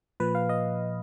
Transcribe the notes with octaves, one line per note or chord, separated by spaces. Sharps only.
A#2 F3 B4
F5
D#5